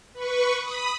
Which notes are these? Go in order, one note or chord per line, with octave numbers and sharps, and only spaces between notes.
B4 C#6
B5 D#6